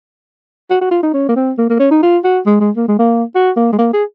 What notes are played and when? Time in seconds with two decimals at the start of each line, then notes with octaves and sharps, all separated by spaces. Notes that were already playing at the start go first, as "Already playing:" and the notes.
0.70 F#4
0.81 F#4
0.91 F4
1.03 D#4
1.14 C#4
1.29 A#3
1.36 C4
1.58 A#3
1.70 A#3
1.79 C#4
1.91 D#4
2.03 F4
2.24 F#4
2.46 G#3
2.60 G#3
2.76 A#3
2.88 G#3
2.99 A#3
3.35 F#4
3.56 A#3
3.73 G#3
3.78 A#3
3.93 G#4